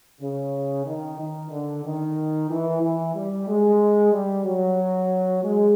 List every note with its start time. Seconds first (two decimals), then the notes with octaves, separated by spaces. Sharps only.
0.21 C#3
0.86 D#3
1.19 D#3
1.50 D3
1.84 D#3
2.50 E3
2.82 E3
3.15 G3
3.48 G#3
4.13 G3
4.45 F#3
5.43 G#3